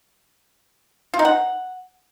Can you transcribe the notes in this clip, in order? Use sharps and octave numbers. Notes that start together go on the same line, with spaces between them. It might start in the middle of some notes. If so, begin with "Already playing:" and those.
F4
D#4
F#5